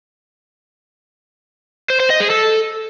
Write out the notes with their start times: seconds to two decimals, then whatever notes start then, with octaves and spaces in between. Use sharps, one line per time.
1.90 C5
2.00 C5
2.10 D#5
2.20 G#4
2.30 A4